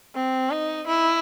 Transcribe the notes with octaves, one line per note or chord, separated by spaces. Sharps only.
C4
D#4
E4